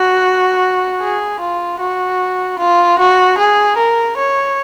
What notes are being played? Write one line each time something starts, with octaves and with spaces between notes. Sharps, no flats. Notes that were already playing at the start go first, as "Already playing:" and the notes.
Already playing: F#4
G#4
F4
F#4
F4
F#4
G#4
A#4
C#5